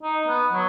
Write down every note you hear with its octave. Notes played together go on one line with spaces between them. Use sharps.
D#4
B3
F#3